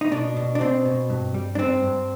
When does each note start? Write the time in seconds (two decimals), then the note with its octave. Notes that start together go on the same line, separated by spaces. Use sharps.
0.01 D#4
0.11 B2 D4
0.37 B2
0.55 D4
0.61 B2 C4
0.85 B2
1.10 G2
1.34 G3
1.55 D4
1.59 G2 C4
1.83 G2